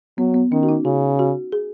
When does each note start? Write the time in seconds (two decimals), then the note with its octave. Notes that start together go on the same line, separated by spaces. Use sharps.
0.18 F#3 B3
0.34 B3
0.52 D#3 C#4
0.63 F#4
0.69 D#4
0.85 C#3 F#4
1.19 F#4
1.52 G#4